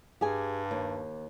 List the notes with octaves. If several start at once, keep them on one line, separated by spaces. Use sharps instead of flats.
G2 G4 G#4 G#5
D#2